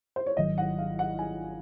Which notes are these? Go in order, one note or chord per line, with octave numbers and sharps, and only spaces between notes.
C5
C#5
G#1 G#2 D#3 F#3 D#5
F#5
F5
F#5
G#5